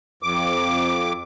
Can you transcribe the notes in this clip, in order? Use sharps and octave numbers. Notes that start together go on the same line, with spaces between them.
F2 D6